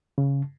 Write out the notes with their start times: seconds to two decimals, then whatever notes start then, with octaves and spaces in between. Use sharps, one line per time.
0.18 C#3